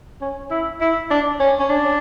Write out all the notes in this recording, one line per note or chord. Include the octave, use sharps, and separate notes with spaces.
C#4
E4
E4
D4
C#4
C#4
D4